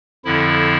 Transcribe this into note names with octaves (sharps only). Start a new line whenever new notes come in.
F2 D3 F3 E4